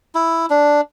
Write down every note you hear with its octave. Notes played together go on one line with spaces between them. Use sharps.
E4
D4